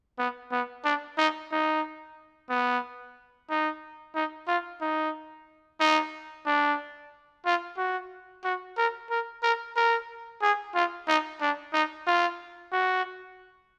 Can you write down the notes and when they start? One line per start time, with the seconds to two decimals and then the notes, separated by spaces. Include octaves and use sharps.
0.19 B3
0.52 B3
0.85 D4
1.18 D#4
1.52 D#4
2.50 B3
3.50 D#4
4.15 D#4
4.48 F4
4.81 D#4
5.80 D#4
6.46 D4
7.45 F4
7.78 F#4
8.44 F#4
8.77 A#4
9.10 A#4
9.43 A#4
9.76 A#4
10.42 G#4
10.75 F4
11.08 D#4
11.41 D4
11.74 D#4
12.07 F4
12.73 F#4